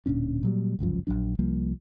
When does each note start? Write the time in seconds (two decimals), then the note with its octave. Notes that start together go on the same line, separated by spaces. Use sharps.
0.06 D1 A#2 C#4 D4
0.43 A#2 F#3 G3
0.79 G1 C#2 F#2 F3
1.07 A#1 F#2 F#3 D4
1.39 C2 F3 G3 A#3